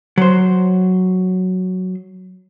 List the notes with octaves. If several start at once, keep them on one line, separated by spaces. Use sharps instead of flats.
F#3 C5